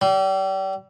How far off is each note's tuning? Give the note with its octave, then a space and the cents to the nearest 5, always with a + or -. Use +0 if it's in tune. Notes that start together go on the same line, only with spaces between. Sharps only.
G3 -35